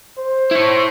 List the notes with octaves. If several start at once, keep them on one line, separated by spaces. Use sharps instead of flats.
C5
E4 C#5